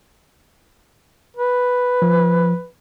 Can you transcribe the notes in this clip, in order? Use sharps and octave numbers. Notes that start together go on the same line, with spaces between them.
B4
F3